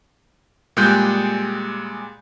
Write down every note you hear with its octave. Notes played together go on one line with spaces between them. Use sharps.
A#2 G3 G#3 G#4 F#6 G6